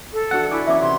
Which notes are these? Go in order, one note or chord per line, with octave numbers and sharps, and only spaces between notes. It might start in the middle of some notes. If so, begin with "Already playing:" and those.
A4
E3 D4 F#4 F#5
E4 G#5 C#6 D6
E3 C#4 D#4 E5 D6
C3 C6